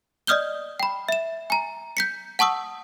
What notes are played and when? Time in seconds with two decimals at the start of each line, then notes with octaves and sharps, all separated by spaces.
0.27 D5 D#5 D#6 F6 G6 G7
0.80 G5 B5
1.09 E5 E7
1.50 G#5 A#5
1.97 G6 B6 C#7
2.39 F#5 A5 C#6 D#6 E6